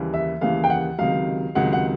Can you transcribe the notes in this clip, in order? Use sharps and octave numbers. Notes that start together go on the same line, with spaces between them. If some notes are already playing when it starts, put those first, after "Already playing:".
Already playing: D#2 C#3 E3 G3 A#3
E5
D#2 C#3 E3 G3 A#3 F5
G5
F#5
C#2 C3 D#3 F#3 F5
C#2 C3 D#3 F#3 F#5
F#5